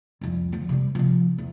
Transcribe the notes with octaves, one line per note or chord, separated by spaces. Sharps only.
C2 F2
D2 F3
C3 G3
C3 F3
E2